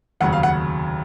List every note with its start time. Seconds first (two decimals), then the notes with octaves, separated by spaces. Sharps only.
0.20 F1 D#2 C#3 F#3 F#5
0.33 F5
0.43 F#5